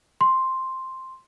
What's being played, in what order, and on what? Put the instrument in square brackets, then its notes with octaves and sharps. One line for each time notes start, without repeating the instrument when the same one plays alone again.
[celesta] C6